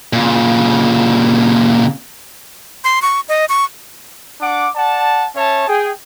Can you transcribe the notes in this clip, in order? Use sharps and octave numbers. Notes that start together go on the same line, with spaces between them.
A#2 C#3
C6
C#6
D#5
C#6
D4 F#5 D6
D5 F#5 A5
C#4 C#5 E5 A5
G#4 G5